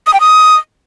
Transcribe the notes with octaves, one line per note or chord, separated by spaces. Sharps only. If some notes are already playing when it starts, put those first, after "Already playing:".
D#6
G5
D#6